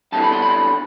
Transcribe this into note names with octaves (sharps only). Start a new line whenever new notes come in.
G2 D3 G3 B3 E4 A5
B5
C6
B5